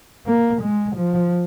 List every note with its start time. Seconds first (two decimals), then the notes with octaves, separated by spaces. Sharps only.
0.27 A#3
0.62 G#3
0.97 F3